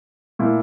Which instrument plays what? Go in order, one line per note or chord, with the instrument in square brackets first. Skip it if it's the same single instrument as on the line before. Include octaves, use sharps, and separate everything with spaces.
[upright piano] A#2 A3 E4